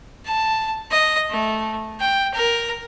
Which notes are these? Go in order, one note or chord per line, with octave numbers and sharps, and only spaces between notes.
A5
D#5
A3
G5
A#4